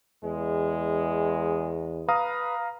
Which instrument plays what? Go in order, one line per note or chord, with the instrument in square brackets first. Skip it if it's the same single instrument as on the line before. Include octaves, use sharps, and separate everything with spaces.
[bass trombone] E2 [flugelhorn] G#3
[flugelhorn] B4 [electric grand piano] F5 A#5 D#6